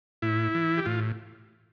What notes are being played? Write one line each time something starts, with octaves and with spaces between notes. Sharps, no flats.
A2 E4
E3
G4
A2 F4